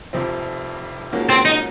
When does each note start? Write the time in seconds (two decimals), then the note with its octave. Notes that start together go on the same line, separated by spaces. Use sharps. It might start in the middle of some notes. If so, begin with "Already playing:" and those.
0.13 F1 F2 C3 F3 C4
1.12 G#2 F3 A#3 C#4 F#4
1.29 C4
1.45 D#4